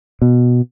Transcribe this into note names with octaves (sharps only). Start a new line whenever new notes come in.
B2